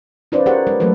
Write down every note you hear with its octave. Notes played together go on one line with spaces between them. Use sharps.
C#4 D#4 F4 B4 C5 D5
G4 G#4 A#4 C5 C#5 F#5
G#3 B4
F#3 A3 A#3 A4 B4